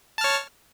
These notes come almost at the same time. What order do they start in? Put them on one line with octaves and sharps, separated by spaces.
A5 F6 C#5